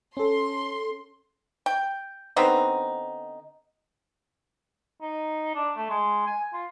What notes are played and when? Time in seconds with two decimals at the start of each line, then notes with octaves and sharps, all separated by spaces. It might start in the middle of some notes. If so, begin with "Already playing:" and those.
0.17 C#4 A4 C6
1.66 G5
2.36 D3 B3 C4 D#4
5.01 D#4
5.55 D4
5.76 A3
5.90 G#3
6.27 G#5
6.53 F4